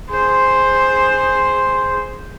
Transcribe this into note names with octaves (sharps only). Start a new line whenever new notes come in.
G#4 C5